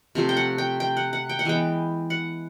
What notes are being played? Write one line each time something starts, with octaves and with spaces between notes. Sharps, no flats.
C3 F3 A3
G5
F#5
G5
G5
F#5
F#5
G5
F#5
E3 G#3 B3 G5
F#5